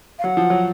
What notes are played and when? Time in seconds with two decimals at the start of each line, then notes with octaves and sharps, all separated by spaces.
0.19 F5
0.24 F#3 F#5
0.37 F3
0.50 F#3